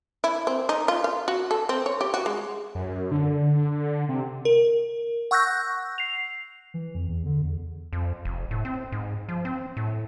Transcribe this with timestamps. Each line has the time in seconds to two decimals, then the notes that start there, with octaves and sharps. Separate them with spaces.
0.24 E4
0.47 C4
0.69 D#4
0.88 F4
1.04 F5
1.28 F#4
1.51 A4
1.69 C4
1.86 C#5
2.01 G4
2.14 F#4
2.26 G#3
2.75 F#2
3.11 D3
4.09 C3
4.45 A#4
5.31 F#5 C#6 E6 F#6 G6 A#6
5.98 C7 F7
6.74 E3
6.95 F2
7.09 E2
7.26 D3
7.42 E2
7.93 F2
8.25 F1
8.51 A2
8.65 C4
8.92 G#2
9.29 F3
9.45 C4
9.77 A2